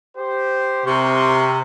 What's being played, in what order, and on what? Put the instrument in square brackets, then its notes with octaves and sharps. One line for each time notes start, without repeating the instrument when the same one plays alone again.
[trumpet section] G4 C5
[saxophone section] C3 [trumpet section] A#4 C6 C#6